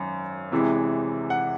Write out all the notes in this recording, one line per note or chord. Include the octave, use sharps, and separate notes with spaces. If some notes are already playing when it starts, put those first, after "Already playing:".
Already playing: G#1 F#2
E2 C3 E3 G#3
F#5